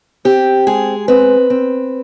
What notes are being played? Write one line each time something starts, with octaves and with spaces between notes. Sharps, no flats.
C4 G4
G#3 G#4
C4 B4
C4